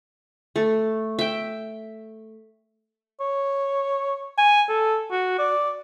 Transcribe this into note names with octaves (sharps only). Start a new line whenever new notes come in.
A3
E5 G5
C#5
G#5
A4
F#4
D5